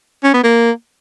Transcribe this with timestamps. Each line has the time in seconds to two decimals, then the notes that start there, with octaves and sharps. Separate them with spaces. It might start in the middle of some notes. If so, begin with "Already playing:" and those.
0.24 C#4
0.34 B3
0.44 A#3